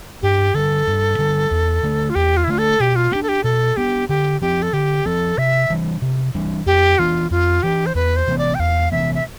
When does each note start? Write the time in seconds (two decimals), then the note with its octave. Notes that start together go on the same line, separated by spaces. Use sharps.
0.22 G2 G4
0.54 D3 G3 A4
0.87 G2
1.19 D3 G3
1.51 E2
1.83 D3 A3
2.10 F4
2.15 E2 G4
2.37 F4
2.44 E4
2.47 D3 A3 F4
2.58 A4
2.80 B2 G4
2.96 F4
3.12 B3 D4 G4
3.23 A4
3.29 G4
3.44 B2 A4
3.77 B3 D4 G4
4.09 D3 G4
4.41 F3 C4 G4
4.62 A4
4.73 D3 G4
5.06 F3 C4 A4
5.38 C3 E5
5.70 E3 G3 D4
6.02 C3
6.35 E3 G3 D4
6.66 F2 G4
6.99 E3 B3 D4 F4
7.31 F2 F4
7.63 E3 B3 D4 G4
7.86 C5
7.95 E2 B4
8.16 C5
8.28 C3 E3 B3
8.38 D5
8.55 G5
8.59 E2 F5
8.92 C3 E3 B3 E5
9.15 E5